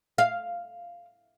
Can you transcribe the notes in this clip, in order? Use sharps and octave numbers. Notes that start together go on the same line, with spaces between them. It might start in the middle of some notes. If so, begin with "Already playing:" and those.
F5